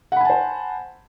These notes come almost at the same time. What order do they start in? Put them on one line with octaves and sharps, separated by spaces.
F#5 B5 G#5 A5 C5